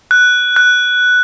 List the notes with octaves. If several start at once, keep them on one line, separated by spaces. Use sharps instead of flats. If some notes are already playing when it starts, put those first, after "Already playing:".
F#6
F#6